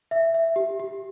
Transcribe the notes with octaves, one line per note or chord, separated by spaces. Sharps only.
E5
E5
G4
G4